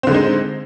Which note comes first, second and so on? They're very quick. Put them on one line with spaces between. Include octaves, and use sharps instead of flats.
C4 D3 G#3 D#4